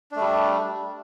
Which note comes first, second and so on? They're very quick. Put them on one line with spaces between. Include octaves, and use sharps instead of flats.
D4 A3 G3